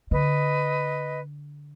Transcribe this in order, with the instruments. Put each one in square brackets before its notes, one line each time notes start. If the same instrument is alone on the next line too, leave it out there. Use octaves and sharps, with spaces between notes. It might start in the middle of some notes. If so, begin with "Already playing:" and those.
[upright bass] D3 [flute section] B4 D#5